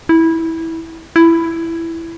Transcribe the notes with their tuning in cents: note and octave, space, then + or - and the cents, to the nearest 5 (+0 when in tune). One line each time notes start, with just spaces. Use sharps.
E4 -15
E4 +10